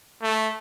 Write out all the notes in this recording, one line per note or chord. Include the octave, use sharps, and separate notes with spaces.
A3